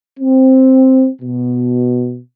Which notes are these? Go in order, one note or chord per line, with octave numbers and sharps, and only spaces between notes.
C4
B2